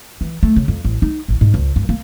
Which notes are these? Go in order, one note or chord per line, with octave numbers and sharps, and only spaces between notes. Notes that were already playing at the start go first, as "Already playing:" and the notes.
E3
A3
C#3
F2
A1
D#4
A1
G#2
C#2
G2
A#3